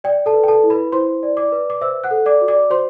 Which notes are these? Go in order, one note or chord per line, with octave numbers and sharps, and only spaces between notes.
D5 G5
A4 A5
B4
G5
A4 A5
E4
B4 B5
E4 C5 C6
D5
D5 D6
B4
D6
C5 E5 E6
F#5 F#6
A4
D5 D6
F#4
D5 D6
F#4 C5 C6